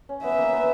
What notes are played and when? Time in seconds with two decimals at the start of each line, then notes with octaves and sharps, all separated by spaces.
0.09 C#4
0.23 B3 E5
0.38 A#3
0.54 B3